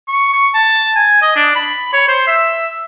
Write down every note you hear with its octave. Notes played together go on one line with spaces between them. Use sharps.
C#6
C#6
A5
G#5
D#5
D4
B5
C#5
C5
E5